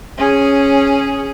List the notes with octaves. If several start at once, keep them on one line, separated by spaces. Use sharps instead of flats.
C#4 G#4